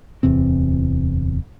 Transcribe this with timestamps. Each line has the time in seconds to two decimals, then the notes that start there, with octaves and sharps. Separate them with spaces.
0.23 D1 E2 C3 C4